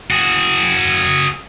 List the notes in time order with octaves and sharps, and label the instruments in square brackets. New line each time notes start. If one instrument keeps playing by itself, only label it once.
[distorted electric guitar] F#4 G#4